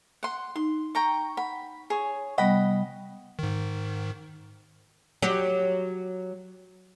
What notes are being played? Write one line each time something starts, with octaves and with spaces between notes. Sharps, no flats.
F#5 C6
D#4 C6
G5 A#5 C#6
F#5 B5
G#4 C#5
C3 G3 B3 D#5 F#5 B5
G#2 D#3
F#3 G4